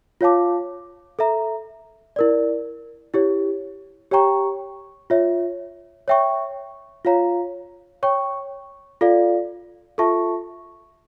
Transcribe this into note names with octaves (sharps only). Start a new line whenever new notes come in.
F4 C#5 F5 A5 D6
A4 E5 A#5
E4 A#4 D5
E4 G4 C#5
G4 C#5 G5 A#5 C#6
F4 C#5 E5
C#5 E5 G5 C#6
F4 C#5 F5 A#5
C#5 G5 C#6
F4 A4 D5 F5
F4 A4 E5 A5 C#6